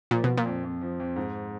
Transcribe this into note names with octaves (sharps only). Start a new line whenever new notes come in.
A#2 F3
B2 F3
A#2
F2
F2
F3
F2
G#2